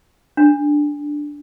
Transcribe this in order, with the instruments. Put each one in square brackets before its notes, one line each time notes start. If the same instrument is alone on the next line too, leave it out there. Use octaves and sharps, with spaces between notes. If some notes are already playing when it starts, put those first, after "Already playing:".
[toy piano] D4